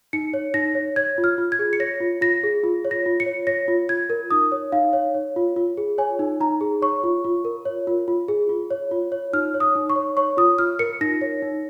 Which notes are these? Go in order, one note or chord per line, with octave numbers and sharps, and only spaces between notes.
D#4 C#7
C#5
D#4 A#6
C#5
C#5 G#6
F4
F6
F4
G#6
G#4
C#7
C#5 A#6
F4
F4 A#6
G#4
F4
C#5
A#6
F4
C#7
C#5
C#5 A#6
F4
F4 G#6
A#4
D#4 D#6
C#5
D#4 F5
C#5
C#5
F4
F4
G#4
C#5 G#5
D#4
D#4 A#5
G#4
C#5 C#6
F4
F4
A#4
C#5
F4
F4
G#4
F4
C#5
F4
C#5
D#4 F6
C#5
D#6
D#4
C#6
C#5
C#5 C#6
F4 D#6
F4 F6
A#4 C#7
D#4 A#6
C#5
D#4